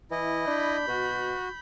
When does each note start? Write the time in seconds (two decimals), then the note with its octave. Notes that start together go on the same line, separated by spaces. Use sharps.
0.11 E3 E4 D#5
0.47 D4 B5 G6
0.88 B2 F#4